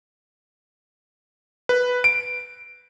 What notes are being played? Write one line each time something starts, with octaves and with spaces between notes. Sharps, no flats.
B4
D7